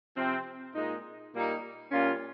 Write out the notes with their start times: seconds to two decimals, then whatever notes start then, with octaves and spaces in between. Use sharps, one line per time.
0.16 C3 F3 C4
0.75 A#2 G#3 D#4
1.34 A#2 G3 A#3 D#4
1.92 A#2 G3 C#4 F4